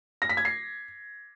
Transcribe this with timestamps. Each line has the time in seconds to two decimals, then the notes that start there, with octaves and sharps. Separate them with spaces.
0.22 A#6
0.29 B6
0.37 G#6
0.45 C7